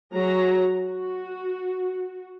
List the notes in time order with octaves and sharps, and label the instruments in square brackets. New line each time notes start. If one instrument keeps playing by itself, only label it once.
[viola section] F#3 G#4 A#5
F#4